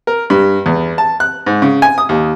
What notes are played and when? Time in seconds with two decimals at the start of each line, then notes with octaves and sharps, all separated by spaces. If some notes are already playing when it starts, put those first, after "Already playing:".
0.07 A#4
0.30 G2
0.66 E2
0.98 A5
1.20 F#6
1.46 G#2
1.62 C#3
1.82 G#5
1.98 D#6
2.09 D#2